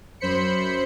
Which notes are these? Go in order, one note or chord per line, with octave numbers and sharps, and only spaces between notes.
F#2 C5 B5 C#7